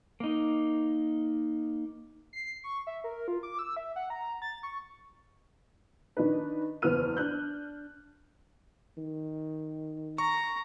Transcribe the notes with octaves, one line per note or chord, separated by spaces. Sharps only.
A#3 D#4
C7
C#6
E5
A#4
F4
D6
E6
E5
F#5
A#5
A6
C#6
D#3 D4 D#4 B4
F#1 E2 B3 F6 D#7
D4 F#6 G6
D#3
A#5 C#6